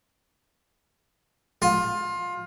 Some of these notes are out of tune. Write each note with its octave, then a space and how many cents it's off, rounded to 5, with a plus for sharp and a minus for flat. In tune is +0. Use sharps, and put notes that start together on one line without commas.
F4 +20